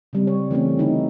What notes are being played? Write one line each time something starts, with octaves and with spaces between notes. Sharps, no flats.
C#3 G3 C4
C#5
E3 A3 C4 C#4
D3 D#4 E4